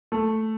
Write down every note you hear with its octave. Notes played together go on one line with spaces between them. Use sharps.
A3